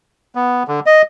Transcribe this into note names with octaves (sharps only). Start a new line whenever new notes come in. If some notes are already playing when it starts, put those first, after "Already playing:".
B3
D3
D#5